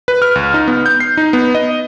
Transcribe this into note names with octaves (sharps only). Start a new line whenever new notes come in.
B4
F6
C#2
D#4
B3
G6
C7
D#4
B3
D#5